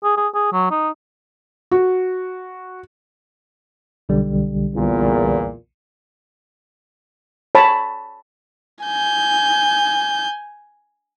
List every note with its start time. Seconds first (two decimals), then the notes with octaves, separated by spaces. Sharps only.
0.04 G#4
0.17 G#4
0.35 G#4
0.53 F#3
0.71 D#4
1.71 F#4
4.09 B1 D3 G3
4.75 E2 A#2
7.55 C#5 A5 B5
8.85 G#5 G6